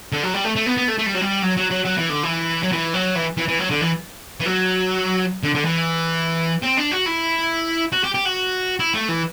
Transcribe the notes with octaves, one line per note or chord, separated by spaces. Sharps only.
D3
F#3
G3
A3
A3
B3
B3
A3
A3
G3
F#3
G3
F#3
F#3
F#3
F#3
E3
D3
E3
F#3
E3
F#3
E3
E3
E3
F#3
D3
E3
E3
F#3
D3
D3
E3
C4
D4
F#4
E4
F#4
G4
G4
F#4
E4
A3
E3